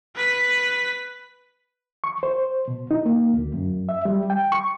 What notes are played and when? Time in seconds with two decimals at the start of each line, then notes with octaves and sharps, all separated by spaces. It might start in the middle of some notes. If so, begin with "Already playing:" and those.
0.16 B4 B6
2.04 C#6
2.23 C5
2.68 B2
2.91 D#4
3.06 A#3
3.34 D2
3.54 F#2
3.89 E5
4.05 G3
4.30 G5
4.52 C#6